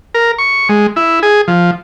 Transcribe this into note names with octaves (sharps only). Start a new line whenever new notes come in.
A#4
C#6
G#3
E4
G#4
F3